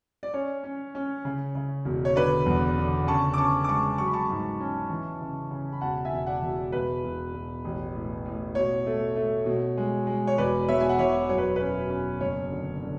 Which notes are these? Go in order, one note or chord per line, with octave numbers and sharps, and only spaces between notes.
D5
C#4 C#5
C#4
C#4
C#3
C#3
E1
C#5
D3 B4 D5
E2
D3
C#3 A5 C#6
D6
C#4 A5 C#6
D6
G#3 A5 C#6
F#3 C#6
B5
A5 C#6
G#2
C#4
E3
C#3
C#3
B5
E1 F#5 A5
E5 G#5
E1
D5 F#5
E1
E1 B4
E1
E1
A1
A2
A2
B2 C#5
A3
A3
B2
G#3
G#3
C#5
E1 B4 D5
B2 C#5 E5
G#5
F#5
E1 C#5 E5
F#2 C#5
B4
C#4 B4
C#4
F#1 C#5
D3
D3